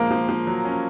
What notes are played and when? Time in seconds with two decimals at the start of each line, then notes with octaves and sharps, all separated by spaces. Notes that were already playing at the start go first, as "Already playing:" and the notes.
Already playing: F3 G#3 A#3
0.11 F3
0.29 F3
0.47 F#3
0.65 C#4